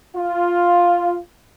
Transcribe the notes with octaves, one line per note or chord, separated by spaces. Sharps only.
F4